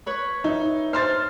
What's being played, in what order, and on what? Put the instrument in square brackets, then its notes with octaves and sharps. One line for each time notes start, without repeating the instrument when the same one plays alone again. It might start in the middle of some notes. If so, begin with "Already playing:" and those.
[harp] B4 C#5 B5
[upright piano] D#4 [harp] E5
[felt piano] C5 C6 A6 [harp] F6